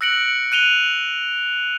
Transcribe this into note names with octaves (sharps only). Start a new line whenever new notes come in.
E6 F#6 A#6 C#7 D7 F#7
F#6 D#7 F7 G7